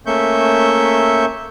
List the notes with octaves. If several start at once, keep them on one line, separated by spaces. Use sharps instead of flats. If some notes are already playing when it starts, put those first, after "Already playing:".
A3 A#3 C#4 E5 C#6 G6